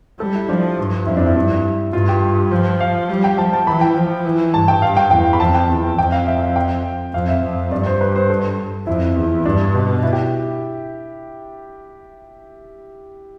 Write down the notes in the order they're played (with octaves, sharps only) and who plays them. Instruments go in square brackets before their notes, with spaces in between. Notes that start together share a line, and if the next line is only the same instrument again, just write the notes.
[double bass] G3 [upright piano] A4
[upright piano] E4
[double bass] F3 [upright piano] D4
[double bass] G2
[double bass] F2 [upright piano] E4
[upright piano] D4
E4
[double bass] G2
[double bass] G2 [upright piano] F4
[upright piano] G4
[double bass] F3
[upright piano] F5
[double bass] G3
[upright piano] G5
[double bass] F3 [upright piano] A5
[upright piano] A5
[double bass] E3 [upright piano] B5
[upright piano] G5
[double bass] F3
E3
[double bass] G2 [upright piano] A5
[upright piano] G5
[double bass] G2 [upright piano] F5
[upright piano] G5
[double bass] E2 [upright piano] G5
[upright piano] B5
[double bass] F2 [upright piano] A5
[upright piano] G5
[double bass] E2
[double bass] F2 [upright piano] G5
[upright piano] F5
E5
F5
G5
[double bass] F2 [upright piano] F5
[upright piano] E5
[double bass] F2
[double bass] G2 [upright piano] D5
[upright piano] C5
B4
C5
A4
[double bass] F2 [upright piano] E4
[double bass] E2
[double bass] G2 [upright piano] D4
[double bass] B2
[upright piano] E4
G4